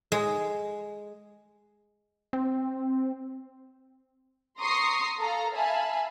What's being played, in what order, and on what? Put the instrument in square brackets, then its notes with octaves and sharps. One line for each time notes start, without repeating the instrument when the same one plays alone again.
[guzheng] G#3
[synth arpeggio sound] C4
[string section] A#5 C6 C#6 D#6 A#6 C7
A4 F5 A#5
E5 F5 G#5 A5 B5